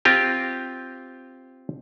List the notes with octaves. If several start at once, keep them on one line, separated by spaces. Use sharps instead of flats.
C4 F4 G4